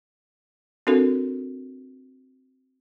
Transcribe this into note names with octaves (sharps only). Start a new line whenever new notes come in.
C4 D4 F#4 A4 A#4